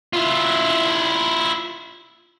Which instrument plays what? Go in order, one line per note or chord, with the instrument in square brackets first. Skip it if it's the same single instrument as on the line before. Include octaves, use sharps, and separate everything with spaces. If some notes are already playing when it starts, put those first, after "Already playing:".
[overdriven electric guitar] E4 F4